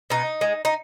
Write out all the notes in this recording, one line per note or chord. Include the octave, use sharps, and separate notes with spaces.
B2 D#4
G#3
D#4